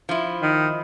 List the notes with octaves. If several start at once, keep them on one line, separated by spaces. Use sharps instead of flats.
F3 E4
D#3